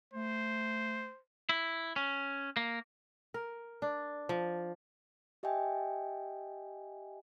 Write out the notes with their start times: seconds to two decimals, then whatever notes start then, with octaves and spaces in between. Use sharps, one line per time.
0.14 A3 C5
1.49 E4
1.96 C#4
2.57 A#3
3.34 A#4
3.82 D4
4.29 F3
5.43 G4 D#5 E5 G5 G#5